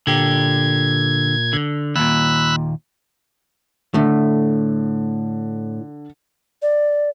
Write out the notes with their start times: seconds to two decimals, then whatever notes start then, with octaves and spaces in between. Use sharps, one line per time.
0.07 A#2 D3 G4 G#6
1.53 D3
1.96 D#2 A#2 B5 E6 F#6
3.94 A2 D3 A3
6.62 D5